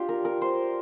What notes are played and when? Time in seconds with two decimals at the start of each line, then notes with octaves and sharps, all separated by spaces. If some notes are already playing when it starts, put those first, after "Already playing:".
Already playing: D4 F4 G4
0.09 A#4
0.25 A#4
0.42 C5